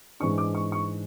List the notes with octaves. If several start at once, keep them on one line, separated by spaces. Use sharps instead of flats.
G#2 E3 G#3 D4 C#6
D6
C#6
C#6